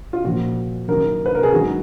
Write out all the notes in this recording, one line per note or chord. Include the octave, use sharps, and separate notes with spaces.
F4
A#2 F3 F#4
F#2 D#3 F#3 A#4
B4
A#4
G#4
G#2 D#3 F#3 F#4